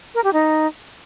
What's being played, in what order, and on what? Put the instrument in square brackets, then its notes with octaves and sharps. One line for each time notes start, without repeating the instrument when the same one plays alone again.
[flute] A#4
G4
D#4